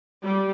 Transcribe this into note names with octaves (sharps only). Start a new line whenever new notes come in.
G3